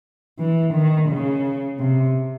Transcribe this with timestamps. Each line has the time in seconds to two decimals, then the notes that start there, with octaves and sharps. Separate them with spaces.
0.39 E3
0.73 D#3
1.09 C#3
1.79 C3